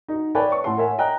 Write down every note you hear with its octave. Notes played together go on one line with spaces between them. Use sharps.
D#4 F#4
B4 C#5 D5 E5 G5 A5
C#6
A2 F#5 A5 C6
A#4 C#5 E5 F#5 G#5
D#5 G5 A#5 F#6